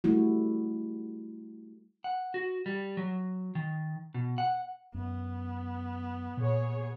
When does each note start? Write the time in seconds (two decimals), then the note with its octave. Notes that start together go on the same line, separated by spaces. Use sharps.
0.04 G3 A3 E4 F#4
2.04 F#5
2.34 F#4
2.66 G3
2.97 F#3
3.55 D#3
4.14 B2
4.38 F#5
4.94 F#2 B3
6.37 A#2 G#4 C#5